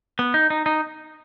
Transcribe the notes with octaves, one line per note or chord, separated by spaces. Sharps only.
B3
D#4
D#4
D#4